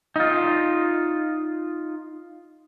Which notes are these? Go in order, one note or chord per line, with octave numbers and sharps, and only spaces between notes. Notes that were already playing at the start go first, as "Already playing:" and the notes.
D#4 F4